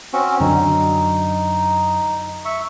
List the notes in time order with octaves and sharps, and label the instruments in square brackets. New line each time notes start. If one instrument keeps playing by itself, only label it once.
[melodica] C4 C#4 F#4
[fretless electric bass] F#2 D3 F#3 [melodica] D#4
[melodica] E5 C#6